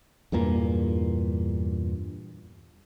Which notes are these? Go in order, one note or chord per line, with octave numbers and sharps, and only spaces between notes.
E2 G2 A#2 A#3